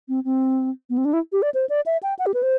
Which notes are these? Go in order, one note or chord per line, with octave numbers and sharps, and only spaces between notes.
C4
C4
B3
C4
D4
E4
G4
D5
C5
D5
E5
G5
F#5
G4
B4
C5